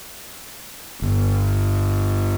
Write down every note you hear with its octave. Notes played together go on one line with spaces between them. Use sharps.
G1